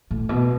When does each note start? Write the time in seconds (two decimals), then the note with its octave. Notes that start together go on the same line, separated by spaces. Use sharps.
0.11 A2
0.29 B2